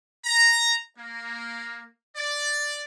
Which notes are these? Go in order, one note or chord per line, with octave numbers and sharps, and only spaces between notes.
A#5
A#3
D5